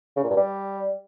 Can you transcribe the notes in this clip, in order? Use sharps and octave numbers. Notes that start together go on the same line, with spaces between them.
C#3
A#2
G2
G3